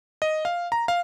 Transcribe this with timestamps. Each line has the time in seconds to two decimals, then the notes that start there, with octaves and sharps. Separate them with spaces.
0.22 D#5
0.45 F5
0.72 A#5
0.88 F5